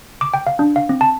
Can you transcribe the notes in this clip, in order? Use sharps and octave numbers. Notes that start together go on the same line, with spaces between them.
D6
G5
F5
D4
F5
C4
A5